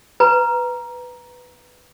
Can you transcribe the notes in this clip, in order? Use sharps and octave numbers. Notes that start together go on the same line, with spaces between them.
B4 A#5